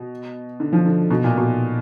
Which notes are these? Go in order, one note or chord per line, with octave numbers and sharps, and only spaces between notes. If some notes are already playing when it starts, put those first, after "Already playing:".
Already playing: B2
D3
F3
D3
B2
A#2
B2